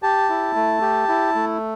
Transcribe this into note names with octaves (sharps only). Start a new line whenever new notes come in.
G4 A5
E4
A3
G4
E4
A3